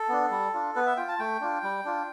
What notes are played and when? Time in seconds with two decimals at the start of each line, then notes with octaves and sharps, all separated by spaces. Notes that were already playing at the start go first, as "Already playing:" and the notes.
Already playing: A4
0.09 B3 D4
0.31 G3
0.54 D4 F4
0.76 B3 B4
0.86 E5
0.97 F4 G5
1.08 A5
1.19 A3 G5
1.41 D4 F4
1.63 G3
1.85 D4 F4